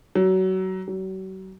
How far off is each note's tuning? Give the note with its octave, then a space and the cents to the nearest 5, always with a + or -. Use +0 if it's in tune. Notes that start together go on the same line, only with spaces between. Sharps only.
F#3 +25
F#3 +40